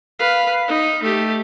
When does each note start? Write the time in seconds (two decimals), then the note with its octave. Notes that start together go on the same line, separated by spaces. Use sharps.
0.19 B4 F5
0.68 D#4
1.03 A3 G4